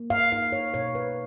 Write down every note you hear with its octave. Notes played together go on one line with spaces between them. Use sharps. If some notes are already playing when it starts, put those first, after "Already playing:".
Already playing: A#3
F5
D#4 F5
C#5
B2 C#5
B4